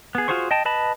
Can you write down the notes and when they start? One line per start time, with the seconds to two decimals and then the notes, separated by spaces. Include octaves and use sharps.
0.15 B3 G#4
0.28 F4 F#4 G#4 C5 C#6
0.51 D#5 G5 A5
0.65 B4 D#5 A5 B5